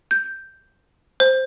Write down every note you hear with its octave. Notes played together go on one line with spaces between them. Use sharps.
G6
C5